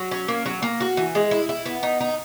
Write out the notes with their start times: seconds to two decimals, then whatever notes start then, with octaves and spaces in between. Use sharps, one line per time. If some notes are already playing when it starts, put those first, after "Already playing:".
Already playing: F#3
0.11 C#4
0.28 A#3
0.46 F#3
0.62 A#3
0.80 F#4
0.97 E3
1.15 G#3
1.31 E4
1.49 E4
1.66 B3
1.83 D#4
2.01 D#4